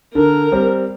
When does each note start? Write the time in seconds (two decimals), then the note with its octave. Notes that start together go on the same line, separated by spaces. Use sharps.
0.14 D3 A#4
0.52 G3 C4